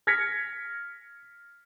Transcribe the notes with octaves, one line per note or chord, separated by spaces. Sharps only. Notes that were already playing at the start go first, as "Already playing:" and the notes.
F6 G#6 A#6 B6 C#7